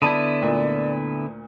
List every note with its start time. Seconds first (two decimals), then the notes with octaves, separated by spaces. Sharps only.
0.02 D3 B3 E4 D5 A5 B5 D#6
0.42 D2 A#2